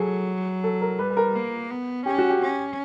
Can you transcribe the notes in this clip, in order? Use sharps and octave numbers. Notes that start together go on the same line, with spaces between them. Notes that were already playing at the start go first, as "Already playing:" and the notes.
Already playing: F#3 G#4 A4
A4
A#4
G3 B4
B4
A#4
A#3
B3
C#4 G4
F#4
G4
C#4